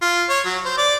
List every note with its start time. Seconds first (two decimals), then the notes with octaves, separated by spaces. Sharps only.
0.02 F4
0.29 C#5
0.45 F#3
0.65 C5
0.78 D5